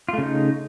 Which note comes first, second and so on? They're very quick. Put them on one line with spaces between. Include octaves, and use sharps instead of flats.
F4 A3 C#3 D#4